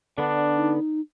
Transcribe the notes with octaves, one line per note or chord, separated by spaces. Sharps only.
D3 B3 D4
D#4